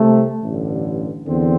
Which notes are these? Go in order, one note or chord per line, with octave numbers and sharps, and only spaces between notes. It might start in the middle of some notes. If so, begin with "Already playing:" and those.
Already playing: C2 C3 A3
A1 G2 D3
E2 D3 C4